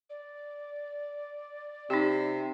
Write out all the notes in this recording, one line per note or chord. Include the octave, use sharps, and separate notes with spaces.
D5
C3 D#4 G4